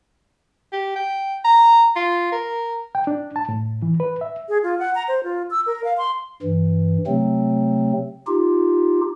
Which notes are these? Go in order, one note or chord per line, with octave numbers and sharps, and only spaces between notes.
G4
G5
A#5
F4
A#4
G5
D4
A5
A2
E3
B4
E5
G#4
F4
F#5
A#5
C5
F4
E6
A#4
F5
C6
G2 E3
C3 F#3 A3 C4
D#4 F4 G4